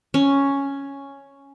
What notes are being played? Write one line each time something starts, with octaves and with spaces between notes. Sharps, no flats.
C#4